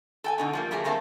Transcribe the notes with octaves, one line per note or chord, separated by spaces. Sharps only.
A4 G5 G#5
B2 D3 D#4
F3 G3 A#3
F#3 G3 A3 A#3 G#4
G2 A3 A#3 C4 G#5 A5